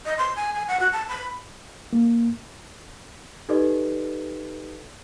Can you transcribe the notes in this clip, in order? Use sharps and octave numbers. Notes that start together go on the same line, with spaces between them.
D#5
C6
G#5
G#5
F#5
F#4
A5
B5
A#3
D#4 G4 A4 B4 D5 D#5